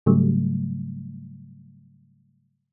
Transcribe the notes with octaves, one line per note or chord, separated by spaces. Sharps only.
G#2 C#3 F#3 G3 A3